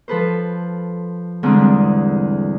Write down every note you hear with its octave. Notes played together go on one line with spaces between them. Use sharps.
F3 A4 B4 C5
E2 G#2 D3 G3 C4